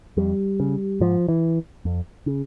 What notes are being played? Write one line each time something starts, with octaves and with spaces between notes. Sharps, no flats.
F2 G3
C#3
G#2 F3
E3
F2
C#3